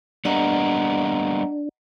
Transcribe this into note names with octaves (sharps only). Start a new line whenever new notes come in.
G3 A#3 B3 D4 D#5 F#5 A#5